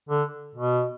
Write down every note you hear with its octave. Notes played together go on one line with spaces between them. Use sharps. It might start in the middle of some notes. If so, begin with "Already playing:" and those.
D3
B2